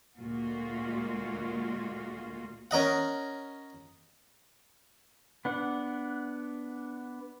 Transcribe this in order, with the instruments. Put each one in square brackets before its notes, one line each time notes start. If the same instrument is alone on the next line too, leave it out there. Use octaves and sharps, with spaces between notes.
[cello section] D2 A#2 G#3 A#3 F4 F#4
[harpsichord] C#4 A#4 D#5 F#5
[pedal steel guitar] B3 D4 F#5